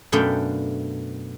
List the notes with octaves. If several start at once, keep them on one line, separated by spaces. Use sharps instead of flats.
F#2 B2 A3 D4 F5 G5